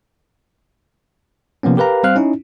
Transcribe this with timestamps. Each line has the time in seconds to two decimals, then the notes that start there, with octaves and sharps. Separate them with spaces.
1.63 C3 F3 A#3 B3 C#4
1.77 G4 A#4 B4 F5 A#5
2.03 G3 C4 C5 F5 F6 F#6
2.16 C#4 D#4 E4